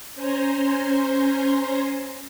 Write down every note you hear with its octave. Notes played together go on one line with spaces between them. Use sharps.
C#4 C5 G#5 A#5 C6